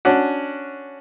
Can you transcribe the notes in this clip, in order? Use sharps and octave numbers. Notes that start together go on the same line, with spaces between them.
C#4 D4 F#4